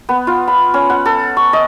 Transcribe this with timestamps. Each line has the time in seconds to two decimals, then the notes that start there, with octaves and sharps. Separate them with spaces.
0.09 B3
0.27 F4
0.48 B5
0.74 C#4
0.90 F#5
1.06 A4
1.37 C#6
1.53 D#5